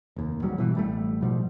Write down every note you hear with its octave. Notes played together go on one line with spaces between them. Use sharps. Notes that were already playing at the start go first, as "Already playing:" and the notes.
F1 D#2
C#2 G#2 F#3 G3
B2 E3
A1 G3 A3
G#2 B2 F3 G3